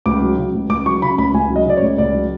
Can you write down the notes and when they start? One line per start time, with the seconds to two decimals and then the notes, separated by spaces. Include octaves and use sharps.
0.06 C#2 D6
0.22 F#3
0.38 C#3
0.54 C#2
0.70 C#2 D6
0.86 F#3 C#6
1.02 C#3 B5
1.18 C#2 B5
1.34 C#2 G#5
1.50 F#3
1.56 D#5
1.66 C#3 D5
1.77 C#5
1.82 C#2
1.98 C#2 D5
2.14 F#3